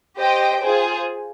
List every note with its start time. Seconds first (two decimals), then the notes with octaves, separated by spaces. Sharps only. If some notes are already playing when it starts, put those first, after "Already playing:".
0.19 G4 C5 D#5 G5
0.61 F4 G#4 C5